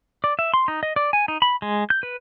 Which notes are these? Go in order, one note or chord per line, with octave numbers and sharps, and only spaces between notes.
D5
E5
C6
D#4
D#5
D5
G#5
D#4
B5
G#3
G6
B4